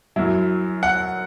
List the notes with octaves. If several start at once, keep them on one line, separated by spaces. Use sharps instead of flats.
F#2 F#3 E4
F#5